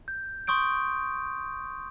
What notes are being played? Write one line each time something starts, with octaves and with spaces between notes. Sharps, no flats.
G6
C6 C#6 D#6 G6 D7